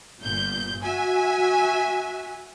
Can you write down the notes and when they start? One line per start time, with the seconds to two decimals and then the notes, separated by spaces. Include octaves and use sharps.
0.22 G1 A#2 G6
0.83 F#4 E5 G#5